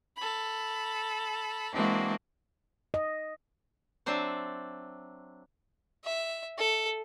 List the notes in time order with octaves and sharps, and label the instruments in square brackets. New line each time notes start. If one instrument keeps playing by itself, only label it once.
[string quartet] A4 B5
E3 G#3 A#3 C4 D4 F#4
[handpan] D#5
[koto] F#3 C4 D4 C5 D5 E5
[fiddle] E5
A4